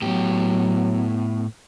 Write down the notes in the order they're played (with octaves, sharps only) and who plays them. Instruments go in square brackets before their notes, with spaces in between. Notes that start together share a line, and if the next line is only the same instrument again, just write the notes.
[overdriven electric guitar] A2 G4 [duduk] F#3 [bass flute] B3